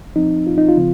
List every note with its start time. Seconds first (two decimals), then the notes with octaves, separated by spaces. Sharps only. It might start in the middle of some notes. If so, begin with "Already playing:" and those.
0.16 F3 C4 D#4
0.47 F4
0.58 D#4
0.68 F4
0.77 C#3 F3 C4